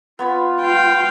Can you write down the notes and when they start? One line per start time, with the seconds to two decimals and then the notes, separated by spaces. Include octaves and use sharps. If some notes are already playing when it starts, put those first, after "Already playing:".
0.19 B3 F4 C#5 B5
0.61 F5 G5